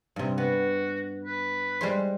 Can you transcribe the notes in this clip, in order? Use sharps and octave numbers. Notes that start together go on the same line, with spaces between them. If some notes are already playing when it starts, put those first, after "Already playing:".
G2 C3
B3 F#4
B4
G3 G#3 C5